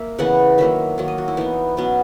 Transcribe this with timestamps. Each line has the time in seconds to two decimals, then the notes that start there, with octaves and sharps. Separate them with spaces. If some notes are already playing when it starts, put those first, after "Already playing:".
Already playing: A#3 E5
0.18 C#3 E3 B3 F#5
0.58 D#3 F#3 A#3 E5
0.98 D#3 F#3 A#3
1.08 D#5
1.18 F#4
1.28 E4
1.37 E3 B3 D#4
1.77 B2 F#3 B3 C#4